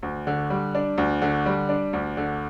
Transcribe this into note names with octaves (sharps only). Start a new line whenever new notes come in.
D2
D3
G3
D4
D2
D3
G3
D4
D2
D3